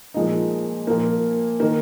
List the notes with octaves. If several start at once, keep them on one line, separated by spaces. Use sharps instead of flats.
A#2 F3 G#3 D#4
A#2 F3 A#3
D#3 A#3